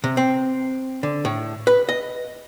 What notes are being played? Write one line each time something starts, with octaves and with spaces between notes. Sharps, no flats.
C3
C4
D3
A2
B4
D#5